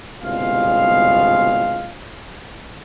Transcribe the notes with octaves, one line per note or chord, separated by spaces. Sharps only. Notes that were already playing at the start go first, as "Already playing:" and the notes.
G1 C2 B2 G#3 F4 F5